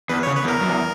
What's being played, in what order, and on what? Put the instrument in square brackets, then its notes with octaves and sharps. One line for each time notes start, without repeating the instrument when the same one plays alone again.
[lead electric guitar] E2 [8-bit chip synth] B4
[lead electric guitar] C#3 [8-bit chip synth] C#5
[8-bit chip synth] B4
[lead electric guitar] E2
[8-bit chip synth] A#4
[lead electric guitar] F#2
E2